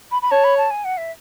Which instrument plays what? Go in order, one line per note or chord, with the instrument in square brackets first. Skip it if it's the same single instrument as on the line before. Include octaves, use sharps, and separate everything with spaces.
[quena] B5
B5
[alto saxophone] C#5 [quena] A5
[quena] B5
A5
G#5
F#5
E5